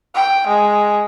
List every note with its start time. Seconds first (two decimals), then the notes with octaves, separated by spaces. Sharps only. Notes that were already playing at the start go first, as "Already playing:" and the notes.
0.15 G5
0.48 G#3